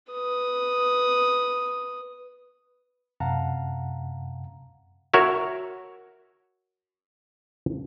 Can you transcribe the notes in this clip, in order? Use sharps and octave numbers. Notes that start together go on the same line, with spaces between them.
B4 D#6
F#2 C3 F5 F#5 A5 A#5
F#4 A#4 C#5 E5